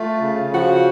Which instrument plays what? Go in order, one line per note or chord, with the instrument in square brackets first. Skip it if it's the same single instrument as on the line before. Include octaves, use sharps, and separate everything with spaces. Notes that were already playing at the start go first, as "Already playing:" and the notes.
Already playing: [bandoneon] A3 [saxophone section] F4
[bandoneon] C#3
[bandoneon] F3 [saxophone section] F#4